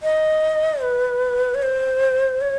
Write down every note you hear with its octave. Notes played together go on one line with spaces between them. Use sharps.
D#5
B4
C#5
C5
C#5